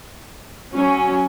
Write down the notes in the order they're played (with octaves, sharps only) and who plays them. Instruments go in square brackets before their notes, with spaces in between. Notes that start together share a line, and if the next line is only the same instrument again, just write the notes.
[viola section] F#3 C#4